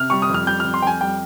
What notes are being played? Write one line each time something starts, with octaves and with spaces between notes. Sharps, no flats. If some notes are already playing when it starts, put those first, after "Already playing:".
Already playing: C3 F6
G3 C#6
D#6
F2
F6
G3 G6
F6
F2
C6
F2 G5 G#5
G3 G5